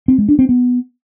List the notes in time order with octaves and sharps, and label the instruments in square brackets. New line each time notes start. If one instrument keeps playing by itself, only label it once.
[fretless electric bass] C4
G#3
D4
C4
B3